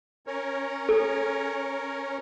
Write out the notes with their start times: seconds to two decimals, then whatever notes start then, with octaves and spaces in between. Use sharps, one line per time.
0.27 C#4 A#4 C#5
0.89 A4